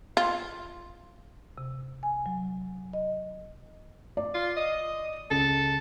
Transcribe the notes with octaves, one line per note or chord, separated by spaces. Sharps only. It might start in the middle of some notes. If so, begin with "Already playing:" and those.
F4
C3
G#5
F#3
D#5
D5
F4
D#5
C#2 A4